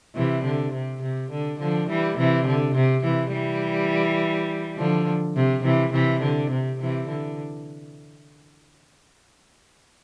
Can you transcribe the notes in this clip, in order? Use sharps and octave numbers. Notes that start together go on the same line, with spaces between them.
C3 E3
D3
C3
C3
D3
D3 F3
E3 G3
C3 E3
D3
C3
C3 E3
E3 G3
D3 F3
C3
C3 E3
C3 E3
D3
C3
C3 E3
D3